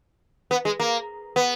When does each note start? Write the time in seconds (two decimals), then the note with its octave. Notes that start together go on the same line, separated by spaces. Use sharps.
0.51 B3
0.65 G#3
0.80 A#3
1.36 B3